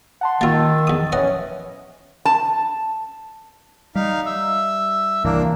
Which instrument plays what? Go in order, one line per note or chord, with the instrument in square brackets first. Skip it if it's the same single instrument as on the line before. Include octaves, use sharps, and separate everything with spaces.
[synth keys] F#5 A5 C6
[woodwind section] D#3 [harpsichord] A#3 F4 [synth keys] E6 A6
[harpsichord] E2 D#6
[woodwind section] E3 C#4 [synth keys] B4 C#5 [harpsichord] D#5 F#5 G#5
[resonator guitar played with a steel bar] A5
[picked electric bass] G3 [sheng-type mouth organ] D#4 F5
[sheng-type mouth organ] E5
[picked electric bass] C2 G2 E3 [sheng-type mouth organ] A#3 D4